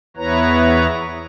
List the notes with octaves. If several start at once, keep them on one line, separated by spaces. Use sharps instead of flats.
E2 B3 E4 B4 C#5 A#5